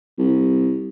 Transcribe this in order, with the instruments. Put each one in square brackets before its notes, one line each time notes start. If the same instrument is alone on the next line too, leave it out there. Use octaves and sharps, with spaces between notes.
[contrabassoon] C2